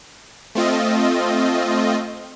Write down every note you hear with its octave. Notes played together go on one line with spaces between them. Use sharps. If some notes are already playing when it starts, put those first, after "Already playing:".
A3 C4 F4 D#5